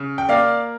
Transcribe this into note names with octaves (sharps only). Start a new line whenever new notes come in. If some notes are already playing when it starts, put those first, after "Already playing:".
Already playing: C#3
G5
A#3 D5 F5